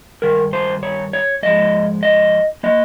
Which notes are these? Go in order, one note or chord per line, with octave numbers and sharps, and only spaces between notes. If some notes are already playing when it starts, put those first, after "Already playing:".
G2 D#3 A#4
C5
C#5
C#5
G#2 F3 G#3 D#5
D#5
F3 A#3 D#5